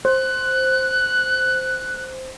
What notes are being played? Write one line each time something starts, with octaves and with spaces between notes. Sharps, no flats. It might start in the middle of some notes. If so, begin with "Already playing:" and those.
C5 F#6